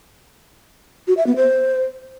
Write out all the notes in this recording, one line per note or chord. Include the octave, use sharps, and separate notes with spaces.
F#4
E5
B3
C5